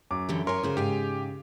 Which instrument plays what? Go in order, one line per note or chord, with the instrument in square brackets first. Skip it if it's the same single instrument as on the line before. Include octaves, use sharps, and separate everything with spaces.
[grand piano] F#2 D6
[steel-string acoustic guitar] D3 E3 G4
[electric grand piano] A#4 C6 [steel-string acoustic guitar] C#5 G#5
[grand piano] C#3 [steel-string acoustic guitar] F#4 C5 G#5
[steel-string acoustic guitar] G#2 F5 G#5 [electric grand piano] G4